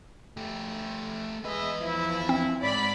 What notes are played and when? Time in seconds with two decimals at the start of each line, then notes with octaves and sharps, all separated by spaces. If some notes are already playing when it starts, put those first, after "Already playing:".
0.37 A3 G4
1.45 E2 G#3 B4 D#5 E5
1.82 F3 E4
2.29 C4
2.63 G#2 D5 B5